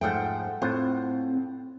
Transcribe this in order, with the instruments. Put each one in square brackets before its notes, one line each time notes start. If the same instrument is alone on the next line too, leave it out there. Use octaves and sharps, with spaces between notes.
[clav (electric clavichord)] G#2 F3 A3 [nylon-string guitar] C5 F#5 G5
[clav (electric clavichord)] A2 F4 F#5 [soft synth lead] C4 [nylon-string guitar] C5